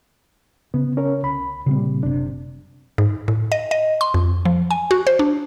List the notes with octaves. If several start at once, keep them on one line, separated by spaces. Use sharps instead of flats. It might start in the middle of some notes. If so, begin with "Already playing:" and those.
C#3 B3
C#4 A#4 C#5
C2 B5
A#2 C#3 G3 C4
F#1 C3 D4
G#2
A2
D#5
D#5
C6
F2
F3
G#5
F#4
C5
D4